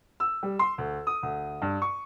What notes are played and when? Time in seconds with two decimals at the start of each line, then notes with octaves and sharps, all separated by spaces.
0.20 E6
0.43 G3
0.59 C6
0.78 D2
1.07 D#6
1.23 D2
1.62 G2
1.82 C#6